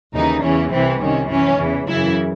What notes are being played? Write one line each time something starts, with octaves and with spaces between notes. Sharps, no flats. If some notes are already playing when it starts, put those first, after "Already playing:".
D#2 C#3 E3 D#4
E2 C#3 E3 C#4
C2 C3 E3 C4
C2 C3 D#3 C#4
F#2 E3 C#4
E2 C#3 E3
F#2 C#3 E3 E4